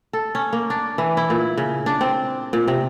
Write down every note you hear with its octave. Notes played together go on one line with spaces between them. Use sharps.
A4
C#4
A#3
D4
E3
E4
A#2
C#3
D4
C4
A#2
C3